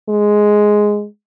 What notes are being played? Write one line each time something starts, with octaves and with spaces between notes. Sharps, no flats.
G#3